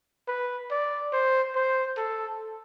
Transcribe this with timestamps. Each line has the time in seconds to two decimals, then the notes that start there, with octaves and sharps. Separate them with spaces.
0.28 B4
0.71 D5
1.13 C5
1.56 C5
1.97 A4